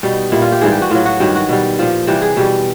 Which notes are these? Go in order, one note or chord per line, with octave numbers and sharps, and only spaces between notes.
B2 G3 D#4
A#2 G3 E4
F4
G4
G#2 E3 G3 G#4
G4
F#4
A2 F#3 F4
F#4
G2 D#3 F#3 G4
F#4
B2 G3
A#2 F3
C3 E3 G3 G4
G#4
B2 G3 G4